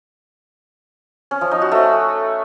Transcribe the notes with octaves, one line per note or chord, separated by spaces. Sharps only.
C#4
F3
D#4
F#4
A3